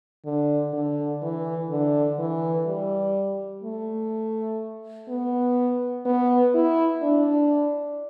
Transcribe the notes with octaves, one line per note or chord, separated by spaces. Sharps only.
D3
D3
E3
D3
E3
G3
A3
B3
B3
E4
D4